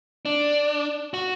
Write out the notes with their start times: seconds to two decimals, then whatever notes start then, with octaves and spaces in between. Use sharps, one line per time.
0.25 D4
1.14 F#4